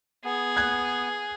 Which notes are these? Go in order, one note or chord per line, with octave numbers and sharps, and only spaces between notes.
B3 G#4
F#6 G#6